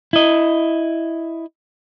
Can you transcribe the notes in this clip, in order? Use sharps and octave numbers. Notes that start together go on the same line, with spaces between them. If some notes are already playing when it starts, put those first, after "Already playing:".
E4 D#5